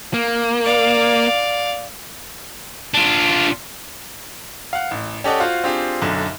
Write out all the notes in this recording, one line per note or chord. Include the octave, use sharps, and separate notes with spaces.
A#3
D5 F5
D4 F4
F5 F#5
A1
C#4 G4 A4 D5 D#5 F#5
F4 F#4 C5 F5
C4 D4 F4 G4 G#4
B1 F#2 D3